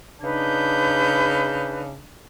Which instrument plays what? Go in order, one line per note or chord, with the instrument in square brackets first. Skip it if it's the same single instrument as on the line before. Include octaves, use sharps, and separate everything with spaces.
[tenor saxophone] C#3 [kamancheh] D4 D#4 [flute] B4 [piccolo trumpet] G6